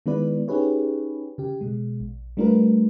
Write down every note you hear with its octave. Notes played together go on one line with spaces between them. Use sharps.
D#3 G#3 B3 E4 B4 D5
C#4 D#4 G4 G#4 B4 C#5
C#3 G4
B2 G#3
A#1
G3 A3 D4 F4 A#4 B4